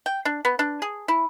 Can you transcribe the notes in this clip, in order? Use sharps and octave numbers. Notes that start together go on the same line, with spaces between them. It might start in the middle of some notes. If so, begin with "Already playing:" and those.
G5
D4
B3
D4
G#4
E4